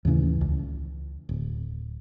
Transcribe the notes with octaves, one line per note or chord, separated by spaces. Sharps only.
D#2 A2 C#3 E3
C#2
D1